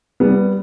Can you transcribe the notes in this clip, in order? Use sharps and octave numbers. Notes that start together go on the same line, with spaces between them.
G3 B3